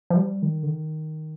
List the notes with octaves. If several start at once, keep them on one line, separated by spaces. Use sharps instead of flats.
F3
G3
D#3
D3
D#3